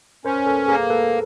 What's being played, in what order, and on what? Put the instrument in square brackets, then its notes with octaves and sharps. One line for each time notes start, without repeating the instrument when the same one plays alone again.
[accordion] C#4 [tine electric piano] A#4 C5
[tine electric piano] A4 B4
[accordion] A#3 [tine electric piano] G#4 A#4
[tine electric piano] A4 B4